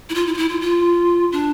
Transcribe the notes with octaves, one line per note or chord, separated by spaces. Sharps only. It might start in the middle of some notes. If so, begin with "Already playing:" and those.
E4
F4
E4
F4
E4
F4
F4
D4